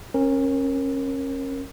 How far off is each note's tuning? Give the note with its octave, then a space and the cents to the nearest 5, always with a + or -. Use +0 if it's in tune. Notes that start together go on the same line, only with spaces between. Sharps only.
C#4 -30 A#4 +0